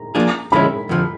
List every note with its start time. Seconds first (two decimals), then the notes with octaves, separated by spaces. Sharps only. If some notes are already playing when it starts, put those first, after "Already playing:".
Already playing: A#5
0.15 F3 A#3 D4 F4 G#4
0.52 D3 F3 G#3 C#4 E4 B5
0.89 F2 D3 F3